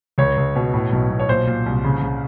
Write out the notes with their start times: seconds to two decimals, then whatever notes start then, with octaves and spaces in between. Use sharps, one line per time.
0.18 C#2 C#5
0.37 C#2
0.55 B2
0.74 A2
0.92 B1
1.10 B1
1.20 C#5
1.29 A#2 C5
1.47 A#2
1.66 C2
1.84 C#3
2.02 C#3